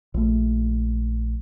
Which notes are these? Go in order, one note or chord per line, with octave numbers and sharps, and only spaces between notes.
A#1 A3